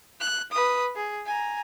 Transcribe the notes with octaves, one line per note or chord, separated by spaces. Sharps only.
F#6
B4 D#6
G#4
G#5 A#5